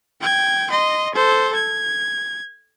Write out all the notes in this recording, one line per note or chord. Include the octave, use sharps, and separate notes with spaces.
G5 G#6
D#5 C6
A4 C5
G#6